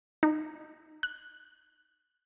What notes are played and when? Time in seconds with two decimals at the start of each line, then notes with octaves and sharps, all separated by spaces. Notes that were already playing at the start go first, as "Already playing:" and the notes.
0.23 D#4
1.03 F#6